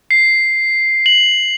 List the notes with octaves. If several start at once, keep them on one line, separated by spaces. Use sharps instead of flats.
C7
F#7